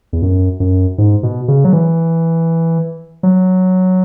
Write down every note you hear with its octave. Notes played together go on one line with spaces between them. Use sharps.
E2
F#2
F#2
G#2
B2
C#3
F#3
E3
F#3